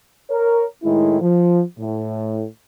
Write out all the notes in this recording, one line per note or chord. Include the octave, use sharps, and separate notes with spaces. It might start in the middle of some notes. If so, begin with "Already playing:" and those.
A#4 C#5
A2 D#3 G#3 E4
F3
A2